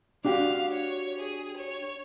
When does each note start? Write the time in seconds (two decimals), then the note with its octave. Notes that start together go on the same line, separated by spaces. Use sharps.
0.25 D4 F#4 G4 F5
0.73 C#5
1.20 G#4
1.57 C#5